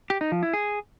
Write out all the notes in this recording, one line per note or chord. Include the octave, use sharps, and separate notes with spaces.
G4
D#4
F3
E4
G#4